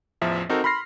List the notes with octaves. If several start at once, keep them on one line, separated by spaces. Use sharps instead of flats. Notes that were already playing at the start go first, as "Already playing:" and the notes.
A1 E2 F3 E5
C4 D#4 F#4 A4 A#4
B5 C6 F6 A#6 C7